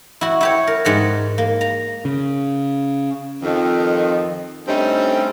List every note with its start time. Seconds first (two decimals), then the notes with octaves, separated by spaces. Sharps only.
0.21 E4 F#4
0.41 E4 G4 C#5
0.67 A#4
0.85 G#2 F#5 A#5
1.38 A#3
1.61 A#5
2.05 C#3
3.43 F2 D#3
4.68 G2 G3 A3 C4 C#4 D#4